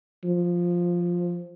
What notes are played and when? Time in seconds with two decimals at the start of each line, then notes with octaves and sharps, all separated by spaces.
0.24 F3